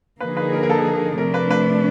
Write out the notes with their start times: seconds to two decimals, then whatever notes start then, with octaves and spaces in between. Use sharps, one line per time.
0.20 D3 F3 A#3 D#4 G#4 B4
0.37 B4
0.53 A#4
0.63 A#4
0.69 A4
1.18 C3 F3 A3 D4 A#4
1.34 B4
1.50 B4